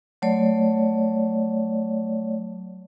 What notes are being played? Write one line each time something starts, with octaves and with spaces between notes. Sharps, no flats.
F#3 A3 C#5 D5